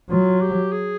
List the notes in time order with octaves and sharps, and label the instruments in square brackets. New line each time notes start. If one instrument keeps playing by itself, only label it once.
[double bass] F#3 [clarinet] F4
[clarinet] G4
G#4